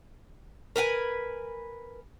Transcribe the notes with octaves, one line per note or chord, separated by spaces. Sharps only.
A#4 B4 F#5 G#5